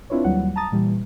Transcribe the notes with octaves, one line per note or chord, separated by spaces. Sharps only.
C4 D4 E4 F4 B4 C#5
D#2 F#3 G3 F#5
A5 A#5 D#6 A6
A#2 E3 G3